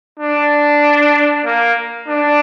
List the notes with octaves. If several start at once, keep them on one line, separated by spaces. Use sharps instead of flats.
D4
A#3
D4